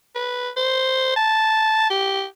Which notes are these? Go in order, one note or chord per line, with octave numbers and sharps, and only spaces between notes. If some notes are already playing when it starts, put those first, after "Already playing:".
B4
C5
A5
G4